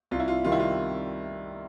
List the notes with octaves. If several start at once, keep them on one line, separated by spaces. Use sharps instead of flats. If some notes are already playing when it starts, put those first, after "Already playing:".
C2 F4
E4
F4
C3 D#3 G3 F4
E4
F4